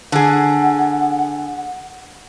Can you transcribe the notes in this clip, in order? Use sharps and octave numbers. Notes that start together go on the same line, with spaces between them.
D3 G#4 F#5